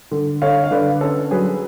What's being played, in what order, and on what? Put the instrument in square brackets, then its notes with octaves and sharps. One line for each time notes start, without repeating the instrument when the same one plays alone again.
[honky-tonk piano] D3
[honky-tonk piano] D3 [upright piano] C#5 F5
[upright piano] F5
[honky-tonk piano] D3 [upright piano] B4 D5
[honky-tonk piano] C#4 [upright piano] A4
[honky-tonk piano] F#3 [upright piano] G#4 B4